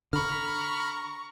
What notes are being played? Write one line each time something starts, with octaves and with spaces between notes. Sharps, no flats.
D3 A#5 B5 C#6 F6